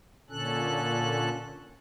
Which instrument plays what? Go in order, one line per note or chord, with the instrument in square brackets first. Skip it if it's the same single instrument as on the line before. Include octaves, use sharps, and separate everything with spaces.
[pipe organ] A#2 D3 C#4 A4 F#6